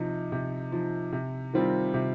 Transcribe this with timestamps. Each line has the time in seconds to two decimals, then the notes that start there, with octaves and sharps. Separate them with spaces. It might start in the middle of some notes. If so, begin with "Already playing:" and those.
Already playing: C3 F3 D#4
0.32 C3
0.72 F3 D#4
1.12 C3
1.53 D#3 G3 C4 F4
1.94 C3